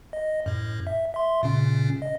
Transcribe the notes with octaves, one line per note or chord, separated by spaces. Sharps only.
D#5
F#2 A2
E5
E5 C6
A#2 C#3 C#4
D#5